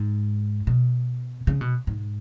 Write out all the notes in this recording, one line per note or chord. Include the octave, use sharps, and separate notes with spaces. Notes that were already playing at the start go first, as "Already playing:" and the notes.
Already playing: G#2
B2
C#3
B2
G#2